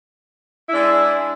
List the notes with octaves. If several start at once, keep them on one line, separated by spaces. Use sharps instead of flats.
G#3 D4 E4